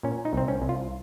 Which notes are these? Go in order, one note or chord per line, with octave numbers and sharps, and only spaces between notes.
A#2 C#4
D#4
C2 C4
C#4
C2
F4